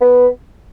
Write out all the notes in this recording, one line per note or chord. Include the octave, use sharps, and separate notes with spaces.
B3